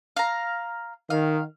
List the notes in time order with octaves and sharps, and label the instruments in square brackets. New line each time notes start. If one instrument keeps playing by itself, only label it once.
[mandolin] F5 A#5
[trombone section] D#3 [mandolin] F5